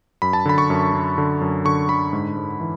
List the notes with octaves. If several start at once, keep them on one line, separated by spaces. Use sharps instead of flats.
F#2 B5
A5
D3 B5
C#6
F#2
F#2
D3
F#2
D3 C#6
D3 B5
G#2
G#2
E3